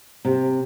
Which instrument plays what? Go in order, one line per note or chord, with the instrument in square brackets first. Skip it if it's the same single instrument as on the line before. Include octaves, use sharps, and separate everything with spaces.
[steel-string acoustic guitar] C3